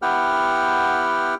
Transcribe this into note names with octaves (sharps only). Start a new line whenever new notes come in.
B3 E4 G4 F#5 G5 F6